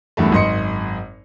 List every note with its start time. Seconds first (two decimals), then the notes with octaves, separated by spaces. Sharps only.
0.17 F#1 E2 G2 A3
0.32 G#1 F#2 D#5 C6 C#7